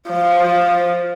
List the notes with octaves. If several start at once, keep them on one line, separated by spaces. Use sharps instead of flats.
F3